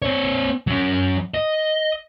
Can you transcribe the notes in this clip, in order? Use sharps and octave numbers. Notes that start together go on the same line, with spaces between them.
C4 C#5
F#3 C#4
D#5